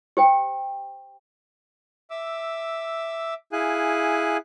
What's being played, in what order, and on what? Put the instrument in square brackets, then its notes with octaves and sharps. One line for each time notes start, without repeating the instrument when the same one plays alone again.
[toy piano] G4 C5 G5
[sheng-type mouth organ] E5 D6 E6
E4 G#4 F5 G#5 F#6